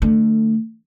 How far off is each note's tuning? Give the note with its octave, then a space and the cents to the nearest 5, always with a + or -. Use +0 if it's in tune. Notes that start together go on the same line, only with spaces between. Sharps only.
D3 +20 A3 +10